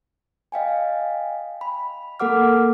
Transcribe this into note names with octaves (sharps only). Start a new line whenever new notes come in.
D#5 F5 G5 G#5
B5
A#3 A4 A#4 F#5 D6 F6